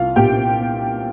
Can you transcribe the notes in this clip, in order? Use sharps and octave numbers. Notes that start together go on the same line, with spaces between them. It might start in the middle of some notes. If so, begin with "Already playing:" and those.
Already playing: C2 F4 F5
A#2 G4 G5